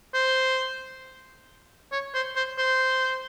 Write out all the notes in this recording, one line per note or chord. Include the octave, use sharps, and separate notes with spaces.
C5
C#5
C5
C5
C5